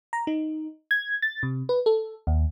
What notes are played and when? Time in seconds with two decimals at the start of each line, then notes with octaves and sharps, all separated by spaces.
0.13 A#5
0.27 D#4
0.91 G#6
1.22 A6
1.43 C3
1.69 B4
1.86 A4
2.27 D#2